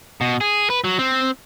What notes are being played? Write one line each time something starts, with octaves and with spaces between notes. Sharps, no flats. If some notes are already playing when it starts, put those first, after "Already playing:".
B2
G#4
B4
F#3
C4